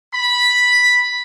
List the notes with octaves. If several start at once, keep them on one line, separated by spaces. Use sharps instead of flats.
B5